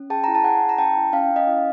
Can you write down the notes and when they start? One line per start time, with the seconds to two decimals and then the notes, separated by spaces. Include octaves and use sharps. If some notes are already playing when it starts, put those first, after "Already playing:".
Already playing: C#4
0.10 G#4 G5 A5
0.24 E4 A#5
0.35 A5
0.44 G#4 F#5 G#5
0.62 E4
0.69 A#5
0.78 C#4 G5 A5
0.96 E4
1.13 C#4 F5 G5
1.31 C#4
1.36 D#5 F5
1.47 E4